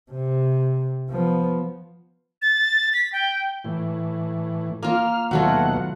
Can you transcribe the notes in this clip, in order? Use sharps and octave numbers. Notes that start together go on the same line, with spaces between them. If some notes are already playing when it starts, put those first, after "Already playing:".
C3
F3 B3
A6
B6
G5
A2 E3
A#3 F4 F6
D#2 B2 F#3 A3 F4 F#5